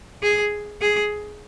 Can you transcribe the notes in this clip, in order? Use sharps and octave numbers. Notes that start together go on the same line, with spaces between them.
G#4
G#4